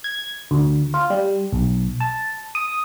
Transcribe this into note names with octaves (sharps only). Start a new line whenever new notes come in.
G#6
D2
F4
G3
B1
A5
D#6